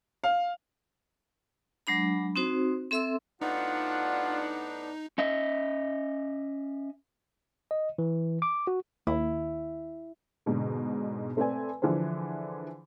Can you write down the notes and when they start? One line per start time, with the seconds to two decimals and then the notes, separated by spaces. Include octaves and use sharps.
0.24 F5
1.87 F#3 G#3 D4 B5
2.36 C4 D#4 F#4 C5
2.91 C4 A4 E5 C6 E6
3.42 A2 B3 D4 D#4 F4 F#5
5.18 C#4 D#5 E5
7.71 D#5
7.98 E3
8.42 D6
8.67 F#4
9.07 D#2 E4
10.46 G#2 B2 D3
11.37 A3 C4 B4 D5 G#5
11.82 D3 E3 F3 G#4 C5